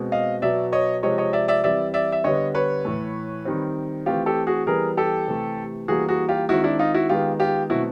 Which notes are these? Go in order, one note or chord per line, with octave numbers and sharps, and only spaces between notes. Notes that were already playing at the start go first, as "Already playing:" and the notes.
Already playing: B2 G#3 C4
D#5 F5
B2 F#3 B3 D5 E5
C#5 D#5
C3 F3 G#3 C4 C#5 D#5
C#5 D#5
D5 E5
D5 E5
E3 G3 C4 D5 E5
D5 E5
E5
D3 G3 B3 C#5 D#5
B4 C#5
A2 E3 A3
D#3 G3 C4
E3 A3 C4 F4 G4
G4 A4
F#4 G#4
E3 G3 B3 G#4 A#4
G4 A4
C3 E3 A3
E3 G3 A#3 F#4 G#4
F#4 G#4
F4 G4
D#3 G#3 C4 E4 F#4
D4 E4
D#4 F4
E4 F#4
D#3 G#3 B3 F4 G4
F4 G4
B2 F#3 A3 C4 E4 F#4